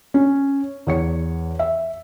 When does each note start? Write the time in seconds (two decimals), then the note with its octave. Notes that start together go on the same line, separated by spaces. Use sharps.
0.14 C#4
0.87 E2 C#5 C#7
1.59 E5